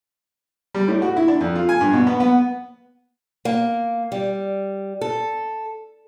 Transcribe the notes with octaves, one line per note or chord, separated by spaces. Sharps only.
G3
A2
F#4
E4
D4
F2
F4
G#5
G2
B2
B3
B3
A#3
G3
A4